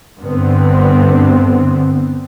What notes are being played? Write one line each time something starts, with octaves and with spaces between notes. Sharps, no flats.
G2 D3 B3 C4